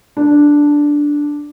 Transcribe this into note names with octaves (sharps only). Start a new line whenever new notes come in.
D4